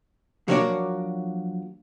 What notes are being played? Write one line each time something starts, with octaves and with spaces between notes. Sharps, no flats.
F3 F#3 A#3 D4 F#4 D5